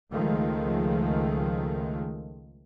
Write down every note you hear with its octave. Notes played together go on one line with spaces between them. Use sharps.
C#2 D#3 F3 G#3 A3